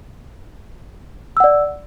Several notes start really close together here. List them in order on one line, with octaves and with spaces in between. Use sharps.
E6 F#5 D5